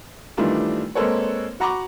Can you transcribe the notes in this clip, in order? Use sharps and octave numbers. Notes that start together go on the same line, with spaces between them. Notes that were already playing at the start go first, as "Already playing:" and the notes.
D#3 E3 G3 A3 D4 F4
G#3 A#3 C4 A4 B4 C#5
F#4 F#5 A#5 B5 C#6 D6